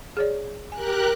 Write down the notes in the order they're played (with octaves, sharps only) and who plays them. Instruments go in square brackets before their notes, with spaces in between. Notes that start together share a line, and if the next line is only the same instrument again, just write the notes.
[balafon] G#4 C#5 D5
[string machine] G4 A#4 F#6 [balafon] G#5